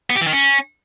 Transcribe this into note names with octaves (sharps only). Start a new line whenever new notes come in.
B3
G4
E3
D#3
C#4